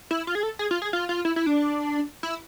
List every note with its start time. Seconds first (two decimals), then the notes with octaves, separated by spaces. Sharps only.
0.11 E4
0.27 F4
0.35 G#4
0.43 A4
0.59 G#4
0.71 F4
0.82 G#4
0.93 F4
1.09 F4
1.25 E4
1.36 E4
1.46 D4
2.23 E4